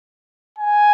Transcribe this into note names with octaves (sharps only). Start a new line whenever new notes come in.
G#5